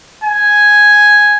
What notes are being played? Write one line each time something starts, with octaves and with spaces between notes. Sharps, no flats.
G#5